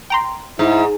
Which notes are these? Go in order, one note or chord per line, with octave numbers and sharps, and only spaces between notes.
G5 A#5 C6
G#2 E4